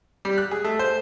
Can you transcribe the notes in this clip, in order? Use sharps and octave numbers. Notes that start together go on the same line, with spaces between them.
G3
F#6
G#4
A3
C5